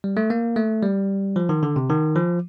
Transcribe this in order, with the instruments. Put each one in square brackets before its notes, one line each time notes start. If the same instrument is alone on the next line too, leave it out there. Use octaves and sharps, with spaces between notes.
[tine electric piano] G3
A3
A#3
A3
G3
F3
D#3
D3
C3
D#3
F3